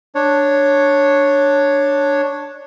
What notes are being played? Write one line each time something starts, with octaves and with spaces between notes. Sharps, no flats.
D4 C#5